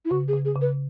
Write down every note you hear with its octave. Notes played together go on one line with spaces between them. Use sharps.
E4
C#3 F#4
G#4
C#3
G#4
C#3
B4